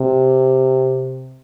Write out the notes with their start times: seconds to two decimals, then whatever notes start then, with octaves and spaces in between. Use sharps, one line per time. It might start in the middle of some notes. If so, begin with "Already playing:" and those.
Already playing: C3